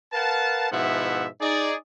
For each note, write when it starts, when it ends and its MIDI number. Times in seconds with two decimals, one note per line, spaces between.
0.13 0.70 70
0.13 0.70 71
0.13 0.70 77
0.13 0.70 78
0.13 0.70 81
0.71 1.26 44
0.71 1.26 47
0.71 1.26 53
0.71 1.26 64
0.71 1.26 76
0.71 1.26 78
1.40 1.74 63
1.40 1.74 68
1.40 1.74 74